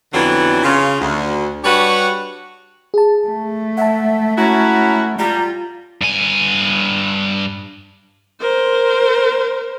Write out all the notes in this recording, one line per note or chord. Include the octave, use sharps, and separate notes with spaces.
F2 D3 E3 F#3 B3 D4
C#3 F4
D2
G3 D4 F#4 G4 B4 C#5
G#4 A5
A3
E5 F#5 A5
C#4 E4 F#4 A#5
G3 F4 A#5
G2 G#5
A#4 C5